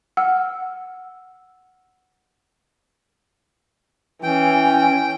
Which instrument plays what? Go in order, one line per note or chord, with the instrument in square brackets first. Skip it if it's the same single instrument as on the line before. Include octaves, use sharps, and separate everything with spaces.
[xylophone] F#5 E6 F6
[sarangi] E3 [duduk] C#4 [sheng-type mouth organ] G5